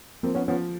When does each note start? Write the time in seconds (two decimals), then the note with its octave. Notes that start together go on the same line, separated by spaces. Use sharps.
0.23 F3 A#3 C4
0.35 B3 C#4
0.48 F3 B3 C#4